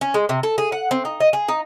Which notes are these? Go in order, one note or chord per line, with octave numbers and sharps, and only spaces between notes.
C#4
G#3
C3
A4
G#4
F#5
C4
D#4
D#5
G#4
D#4